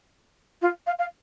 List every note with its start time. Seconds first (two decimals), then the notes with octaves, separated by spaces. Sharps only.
0.62 F4
0.87 F5
0.99 F5